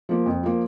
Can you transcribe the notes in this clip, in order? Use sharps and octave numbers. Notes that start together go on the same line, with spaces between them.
F3 A#3
F2
F3 A#3